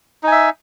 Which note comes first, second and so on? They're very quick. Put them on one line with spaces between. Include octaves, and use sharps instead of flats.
D#4 G#5 E5